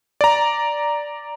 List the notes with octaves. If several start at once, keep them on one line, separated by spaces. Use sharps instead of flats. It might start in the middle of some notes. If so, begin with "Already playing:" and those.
D5 A#5